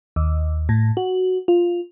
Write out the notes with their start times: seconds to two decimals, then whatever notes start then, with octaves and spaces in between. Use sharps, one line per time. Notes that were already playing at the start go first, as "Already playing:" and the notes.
0.16 D#2
0.69 A2
0.97 F#4
1.48 F4